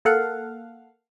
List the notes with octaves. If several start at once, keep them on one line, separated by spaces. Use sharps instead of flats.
A#3 A4 F5 F#5